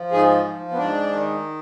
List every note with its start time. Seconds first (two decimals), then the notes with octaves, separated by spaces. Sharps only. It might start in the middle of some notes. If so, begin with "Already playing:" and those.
Already playing: F3
0.12 G#2 G#4
0.45 F3
0.72 B3
0.77 G#2 D4
1.11 D#3